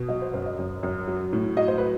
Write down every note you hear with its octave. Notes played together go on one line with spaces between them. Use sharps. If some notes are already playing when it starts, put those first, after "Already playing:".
Already playing: B2
F#3 D#5
C5
F#2 C5
D#5
F#2
F#2
F#3
A2
F#3 D#5
C5
B4